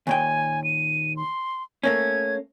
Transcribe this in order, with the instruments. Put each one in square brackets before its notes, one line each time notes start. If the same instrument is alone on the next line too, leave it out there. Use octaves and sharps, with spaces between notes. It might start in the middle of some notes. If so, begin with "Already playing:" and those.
[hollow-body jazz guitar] D#2 A#2 G5 [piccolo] G#5
[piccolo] D#7
C6
[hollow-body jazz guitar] A3 A#3 C#4 [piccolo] G#6